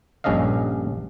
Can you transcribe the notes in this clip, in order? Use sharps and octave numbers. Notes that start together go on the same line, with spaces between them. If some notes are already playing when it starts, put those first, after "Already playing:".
A#1 G2 C#4 A4 D#5 F5